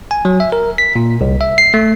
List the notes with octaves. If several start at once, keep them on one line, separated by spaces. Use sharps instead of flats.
G#5
F#3
E5
A#4
B6
A#2
C2
E5
C7
A3